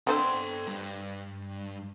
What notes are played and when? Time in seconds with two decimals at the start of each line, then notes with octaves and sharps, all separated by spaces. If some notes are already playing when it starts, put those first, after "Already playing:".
0.07 D3 C4 A4 C5 G5
0.68 G2